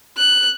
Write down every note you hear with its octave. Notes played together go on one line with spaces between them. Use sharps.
F#6